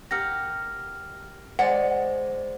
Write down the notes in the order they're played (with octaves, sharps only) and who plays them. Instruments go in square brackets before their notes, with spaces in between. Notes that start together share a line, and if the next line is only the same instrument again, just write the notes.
[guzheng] G4 A#4 F#5 [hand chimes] F6 A#6
[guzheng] G#3 D5 D#5 [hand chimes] C5 [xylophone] F#5